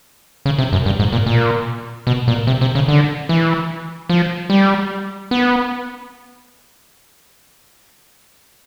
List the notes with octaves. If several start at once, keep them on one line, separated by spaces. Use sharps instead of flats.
C#3
C3
F#2
G2
G#2
A#2
A#2
B2
A#2
C3
C3
C#3
D3
E3
F3
G3
B3